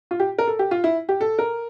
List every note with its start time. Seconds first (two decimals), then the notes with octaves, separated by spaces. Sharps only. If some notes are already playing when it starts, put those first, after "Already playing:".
0.11 F4
0.20 G4
0.39 A#4
0.47 A4
0.59 G4
0.71 F4
0.84 E4
1.09 G4
1.21 A4
1.39 A#4